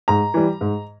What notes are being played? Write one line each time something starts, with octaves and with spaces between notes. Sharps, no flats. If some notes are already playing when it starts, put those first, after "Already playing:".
G#2 A#5
E3 G3
G#2